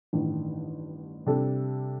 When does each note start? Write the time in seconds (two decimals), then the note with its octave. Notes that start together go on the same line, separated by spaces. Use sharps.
0.13 A1 G2 D#3
1.26 C3 G3 D4 A4